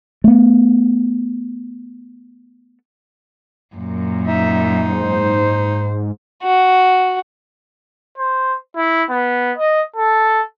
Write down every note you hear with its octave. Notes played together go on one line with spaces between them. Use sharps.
A3 B3
F#2 A#2
D#4 E5
G#2 C5
F#4
C5
E4
B3
D#5
A4